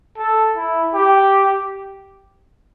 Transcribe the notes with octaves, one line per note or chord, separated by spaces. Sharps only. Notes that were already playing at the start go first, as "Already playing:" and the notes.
A4
E4
G4